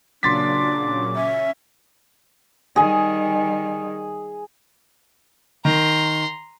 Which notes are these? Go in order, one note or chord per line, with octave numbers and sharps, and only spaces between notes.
A#2 C#3 F#3 D4 C6 D6 A6 B6
C#4 E5
D#3 G3 G#4 G#5
D#3 A#5 C6